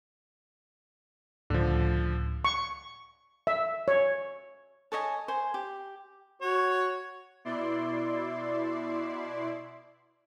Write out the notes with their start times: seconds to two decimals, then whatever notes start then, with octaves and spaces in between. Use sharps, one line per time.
1.50 C#2 A2 D3 F3
2.45 C#6
3.47 E5
3.88 C#5
4.92 A4 C#5 D#5 G#5
5.28 C5 G#5
5.54 G4
6.42 F#4 C#5
7.45 B2 E4 D5 C6